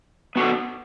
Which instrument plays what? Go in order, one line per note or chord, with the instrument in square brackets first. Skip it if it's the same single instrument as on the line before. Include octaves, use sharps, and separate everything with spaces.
[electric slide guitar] B3 F#4 A4